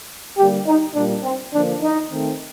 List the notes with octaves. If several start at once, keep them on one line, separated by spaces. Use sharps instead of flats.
D3 G3 A#3 G4
D#4
A#2 G3 A#3 D4
C4
D3 F3 A#3 D4
D#4
D#3 A3 C4